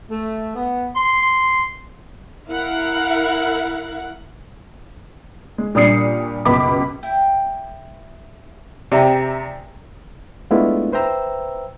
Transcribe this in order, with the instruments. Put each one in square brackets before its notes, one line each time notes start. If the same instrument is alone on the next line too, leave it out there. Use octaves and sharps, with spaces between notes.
[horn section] A3
B3
C6
[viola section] E4 A#4 F5 F#5
[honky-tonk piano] G#3
A#2 G3 D4 D#6 C7 C#7
C#2 F#2 B2 B5 D6 B6
[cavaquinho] E4 G5
[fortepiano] C3 [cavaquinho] G#4 G5 [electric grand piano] D5 E5 A#5
[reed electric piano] G#3 A3 B3 D4 E4 F4
B4 C5 E5 G5 A#5 E6